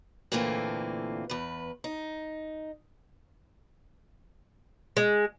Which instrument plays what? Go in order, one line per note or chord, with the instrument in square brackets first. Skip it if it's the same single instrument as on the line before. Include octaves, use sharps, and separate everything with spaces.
[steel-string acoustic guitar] A#2 D3 E3 A3 A#3 C4
E2 B4
D#4
[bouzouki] G#3